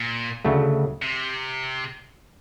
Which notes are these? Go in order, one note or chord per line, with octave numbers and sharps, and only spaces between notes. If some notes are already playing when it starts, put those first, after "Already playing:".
Already playing: A#2
D2 C#3 F#3 A3
C3